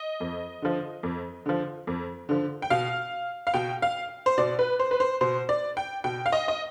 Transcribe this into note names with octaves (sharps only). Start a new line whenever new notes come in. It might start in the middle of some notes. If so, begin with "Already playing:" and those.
Already playing: D#5
F2
D3 F3
F2
D3 F3
F2
D3 F3
G5
B2 F5
F5
B2 G5
F5
C5
B2 D5
B4
C5
B4
C5
B2 C5
D5
G5
B2 G5
F5
D#5
D#5